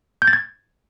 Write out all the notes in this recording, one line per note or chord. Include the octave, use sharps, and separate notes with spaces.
G6
A6
G#6